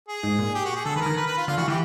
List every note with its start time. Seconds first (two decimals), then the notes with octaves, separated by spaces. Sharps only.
0.08 G#4
0.23 G#2
0.39 A#2
0.55 G4
0.65 F#4
0.76 G#4
0.85 D3 A4
0.96 D#3 B4
1.01 A#4
1.06 D#3
1.17 B4
1.27 B4
1.37 F4
1.48 D3 F4
1.57 E3 F#4
1.68 E3 G4